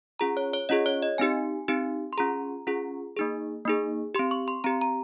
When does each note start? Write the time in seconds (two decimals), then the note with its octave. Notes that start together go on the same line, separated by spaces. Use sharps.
0.20 C#4 F4 G#4 A#5
0.37 C#5
0.53 C#5
0.69 C#4 F4 G#4 D#5
0.86 C#5
1.03 D#5
1.18 C4 D#4 G4 G#5
1.68 C4 D#4 G4
2.13 C6
2.17 C#4 F4 G#4 A#5
2.67 C#4 F4 G#4
3.17 A#3 D#4 G#4
3.65 A#3 D#4 G#4
4.15 C4 G4 C6
4.31 C#6
4.48 C6
4.64 C4 G4 A#5
4.81 A#5